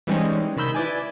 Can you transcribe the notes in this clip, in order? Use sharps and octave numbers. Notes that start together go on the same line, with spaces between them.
E3 G3 G#3 C4 C#4 D#4
C3 D#3 B5 E6 G6
E4 B4 D5 G#5